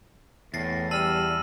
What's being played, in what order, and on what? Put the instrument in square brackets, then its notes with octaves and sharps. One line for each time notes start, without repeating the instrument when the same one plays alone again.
[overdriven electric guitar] E2 [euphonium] A2 [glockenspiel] A6 A#6 C7
[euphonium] G3 [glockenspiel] A5 F6 E7 [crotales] E6 D#7